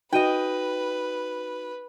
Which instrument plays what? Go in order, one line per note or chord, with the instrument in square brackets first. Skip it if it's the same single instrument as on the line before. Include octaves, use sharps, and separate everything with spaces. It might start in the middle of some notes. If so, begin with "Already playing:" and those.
[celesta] D#4 F#4 D#7 [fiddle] B4 [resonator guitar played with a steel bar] D#5 G5